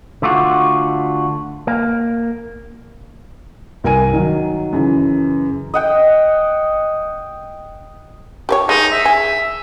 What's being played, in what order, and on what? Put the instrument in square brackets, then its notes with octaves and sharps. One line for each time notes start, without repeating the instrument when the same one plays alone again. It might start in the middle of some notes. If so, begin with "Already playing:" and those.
[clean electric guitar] D3 A3 F4 F#4
A#3
[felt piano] C2 A#4 G#5 D#7
D#3 F#3
F#2 C#3 E3
[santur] D#5 F#5 G5
[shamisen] G4 B4 C#5
[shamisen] G#3 [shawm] D#4
[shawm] E5
[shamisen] G#4